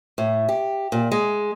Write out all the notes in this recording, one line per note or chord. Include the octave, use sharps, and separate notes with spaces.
A2
G4
A#2
G#3